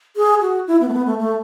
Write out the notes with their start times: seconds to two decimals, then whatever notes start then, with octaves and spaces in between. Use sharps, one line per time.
0.16 G#4
0.41 F#4
0.67 E4
0.81 B3
0.88 A3
0.93 B3
1.06 A3
1.19 A3